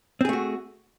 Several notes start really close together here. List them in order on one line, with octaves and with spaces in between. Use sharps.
C4 G#4 A3 F#4